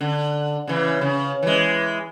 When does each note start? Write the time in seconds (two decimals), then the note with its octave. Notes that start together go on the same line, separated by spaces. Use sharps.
0.01 D3
0.67 C#3 E3
1.01 C#3
1.43 E3 G#3